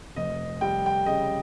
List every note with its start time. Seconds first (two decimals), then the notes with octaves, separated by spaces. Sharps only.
0.16 F1 D#5
0.61 G3 G5
0.86 G5
1.06 C#3 D#5